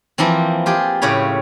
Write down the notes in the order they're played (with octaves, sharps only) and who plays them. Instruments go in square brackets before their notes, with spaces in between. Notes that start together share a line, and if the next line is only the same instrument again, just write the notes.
[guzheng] E3 F3 A#3 C4
F4 G4 G#4
A2 C#3 G4 C#5 B5